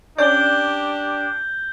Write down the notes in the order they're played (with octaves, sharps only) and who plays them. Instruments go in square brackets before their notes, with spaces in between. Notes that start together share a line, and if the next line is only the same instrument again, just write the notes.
[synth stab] C#4 D5 [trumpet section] D4 G4 [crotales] G6 G7